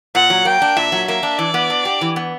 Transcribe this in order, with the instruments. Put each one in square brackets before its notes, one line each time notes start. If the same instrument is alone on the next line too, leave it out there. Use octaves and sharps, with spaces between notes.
[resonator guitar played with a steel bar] A#2 [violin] F#5
[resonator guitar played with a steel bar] F#3
[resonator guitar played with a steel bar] A#3 [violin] G5
[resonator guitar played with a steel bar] D4
[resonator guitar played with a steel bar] A#2 [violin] E5
[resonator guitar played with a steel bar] F#3
[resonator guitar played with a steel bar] A#3 [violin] E5
[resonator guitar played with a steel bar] D4
[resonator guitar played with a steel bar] E3 [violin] D5
[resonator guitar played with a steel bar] B3
D4
G4
E3
B3